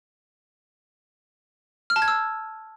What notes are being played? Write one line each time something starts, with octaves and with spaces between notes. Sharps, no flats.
F6
A5
G#6
E6